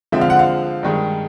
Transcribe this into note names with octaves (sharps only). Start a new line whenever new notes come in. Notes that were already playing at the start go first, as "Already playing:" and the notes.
D3 F3 G#3 C4 E5
F5
F#5
F5
G2 D#3 G#3